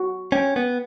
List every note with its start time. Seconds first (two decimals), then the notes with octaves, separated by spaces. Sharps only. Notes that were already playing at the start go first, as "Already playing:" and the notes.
Already playing: F#4
0.32 C#4 G5
0.56 B3